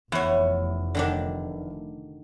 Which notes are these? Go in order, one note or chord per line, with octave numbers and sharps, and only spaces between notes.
F1 E2 C#5 F#5
D3 D#3 D4